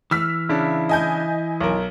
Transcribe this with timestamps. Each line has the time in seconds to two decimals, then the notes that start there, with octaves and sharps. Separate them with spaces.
0.11 E3 E6 F6 B6
0.49 C#3 D4 E4
0.89 D#5 G#5 G6
1.61 B1 A#4